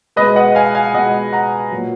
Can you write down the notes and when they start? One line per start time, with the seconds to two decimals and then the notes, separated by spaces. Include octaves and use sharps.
0.16 B2 G#3 B4 D#5
0.36 D#5 F#5
0.55 F5 G#5
0.75 F5 G#5
0.94 B2 G#3 D#5 F#5
1.33 F#5 A#5
1.72 A#2 F#3